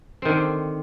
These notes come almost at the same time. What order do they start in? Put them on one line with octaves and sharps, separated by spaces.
C4 D#3 D3